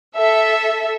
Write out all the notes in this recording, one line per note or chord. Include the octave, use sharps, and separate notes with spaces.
A4 E5